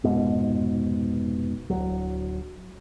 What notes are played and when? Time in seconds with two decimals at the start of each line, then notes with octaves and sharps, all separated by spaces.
0.04 F1 G#2 B2
1.70 D1 F#3